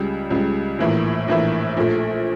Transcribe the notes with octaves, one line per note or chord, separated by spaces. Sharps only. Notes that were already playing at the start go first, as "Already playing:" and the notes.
Already playing: C#2 C#3 G3
C#2 C#3 G3
A#1 A2 E3 A#3 E4
A#1 A2 E3 A#3 E4
A#1 A#2 A3